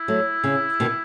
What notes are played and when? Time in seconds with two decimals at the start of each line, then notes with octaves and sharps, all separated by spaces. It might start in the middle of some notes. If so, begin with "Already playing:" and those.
Already playing: E4
0.08 F#3 A3
0.44 C#3
0.80 B2 D#3